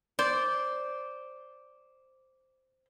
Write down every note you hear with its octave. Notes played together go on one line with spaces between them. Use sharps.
C5 D5